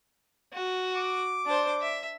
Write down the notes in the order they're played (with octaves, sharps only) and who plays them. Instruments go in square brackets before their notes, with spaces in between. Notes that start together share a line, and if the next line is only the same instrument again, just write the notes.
[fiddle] F#4
[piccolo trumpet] D6
[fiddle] D4 C5
E5